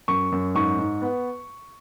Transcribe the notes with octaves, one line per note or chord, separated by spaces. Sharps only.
F#2 C#6
F#2
G#2 C#6
G#2
B3